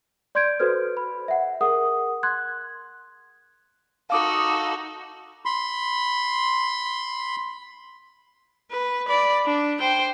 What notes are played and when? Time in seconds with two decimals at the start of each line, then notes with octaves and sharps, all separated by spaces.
0.35 D5 C6 G6 G#6 D7
0.59 F#4 A4 B4 C5 F6
0.97 B5
1.28 E5 F#5
1.61 G#4 A#4 F#5 D#6
2.23 C6 F#6 G#6
4.10 D#4 F#4 A4 F5 D6 D#6
5.45 B5 C6
8.71 B4
9.07 D5 B5
9.46 D4
9.79 C5 G5